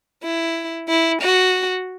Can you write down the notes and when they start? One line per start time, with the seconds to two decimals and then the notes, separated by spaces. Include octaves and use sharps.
0.24 E4
0.89 E4
1.22 F#4